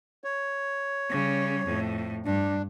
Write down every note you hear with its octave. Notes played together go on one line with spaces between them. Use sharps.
C#5
C#3 G3
F2 A2
G2 D4